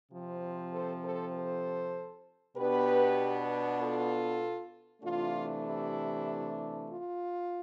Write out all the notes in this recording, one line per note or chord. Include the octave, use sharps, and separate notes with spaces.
C3 F3 C4
A4 C5
A4 C5
A4 C5
B2 B3 D4 G4 B4
F4 A4
C3 E3 A3 D4 F4
E4 G4
F4